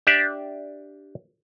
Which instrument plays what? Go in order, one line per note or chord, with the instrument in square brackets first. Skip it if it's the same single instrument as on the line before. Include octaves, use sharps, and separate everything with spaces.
[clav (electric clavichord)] D4 G4 D5 E5